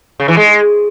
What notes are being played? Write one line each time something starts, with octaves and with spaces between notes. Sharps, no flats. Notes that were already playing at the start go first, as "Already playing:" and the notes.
C#3
E3
G#3